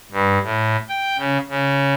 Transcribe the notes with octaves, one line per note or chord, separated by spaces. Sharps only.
G2
A2
G5
C#3
C#3